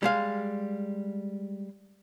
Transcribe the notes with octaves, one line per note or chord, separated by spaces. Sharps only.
G3 G#3 F5